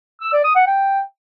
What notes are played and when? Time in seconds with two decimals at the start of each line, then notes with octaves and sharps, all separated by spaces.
0.21 E6
0.33 D5
0.44 D#6
0.56 F#5
0.67 G5